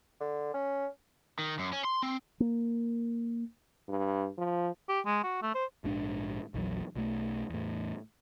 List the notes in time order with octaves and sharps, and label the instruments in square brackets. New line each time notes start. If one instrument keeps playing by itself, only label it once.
[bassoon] D3
C#4
[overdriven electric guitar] D#3
F#2
C#4
C6
C4
[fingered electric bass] A#3
[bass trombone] G2
F3
[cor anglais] G4
G#3
F#4
A3
C5
[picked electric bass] A#1 G#2 D4
A#1 E2 F#3
B1 A3
E2 A2